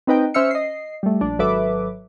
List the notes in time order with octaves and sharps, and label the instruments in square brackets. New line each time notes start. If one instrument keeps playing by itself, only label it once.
[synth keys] C4 D#4 B4 D#5 G5
C#4 C5 E5 E6 F6 C#7
D#5 C7
G3 A3
A#1 D4
G#1 F#3 A4 B4 E5 D6